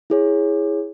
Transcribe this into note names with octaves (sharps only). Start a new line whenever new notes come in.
E4 G#4 C#5